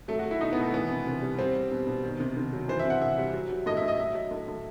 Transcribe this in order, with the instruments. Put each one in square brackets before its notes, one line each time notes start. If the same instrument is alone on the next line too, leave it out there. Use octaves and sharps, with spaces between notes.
[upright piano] F#3 A3
F#4
F#3
E4
B2 D#4
B3
B2
A3
E3 B3
C3
C3
G3
G3 C4
G3
B2
B2
D#3
C3
C3
F#3
E3 C5
E5
C3
F#5
C3 E5
G3
F#3
F#3
A2 D#5
E5
A2
D#5
F#3 E5
F#3
A2
A2